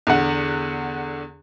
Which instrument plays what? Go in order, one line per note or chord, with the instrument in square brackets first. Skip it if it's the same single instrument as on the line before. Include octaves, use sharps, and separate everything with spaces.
[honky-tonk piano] E2 D3 F#5